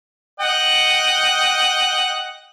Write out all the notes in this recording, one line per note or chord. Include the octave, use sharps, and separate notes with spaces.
D#5 F#5 G5